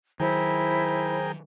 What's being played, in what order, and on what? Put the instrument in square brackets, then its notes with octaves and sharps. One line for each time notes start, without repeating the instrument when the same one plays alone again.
[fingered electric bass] D#3 F#3 [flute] E4 [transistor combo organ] G#4 A#4 G5 [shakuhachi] C5